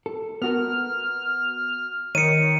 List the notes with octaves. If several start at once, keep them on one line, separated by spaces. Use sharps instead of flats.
A4
B3 F#4 A#4 F6
D#3 C#5 C#7 D#7